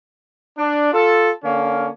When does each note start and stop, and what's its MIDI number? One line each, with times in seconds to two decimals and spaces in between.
0.57 0.90 62
0.92 1.30 65
0.92 1.30 69
1.43 1.89 50
1.43 1.89 58
1.43 1.89 61